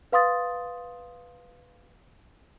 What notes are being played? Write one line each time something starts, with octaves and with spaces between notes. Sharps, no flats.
B4 F5 C6 D#6 A6